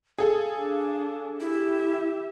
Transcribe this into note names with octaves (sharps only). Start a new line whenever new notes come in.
G#4 A4 F5
D4
E4 G4 E5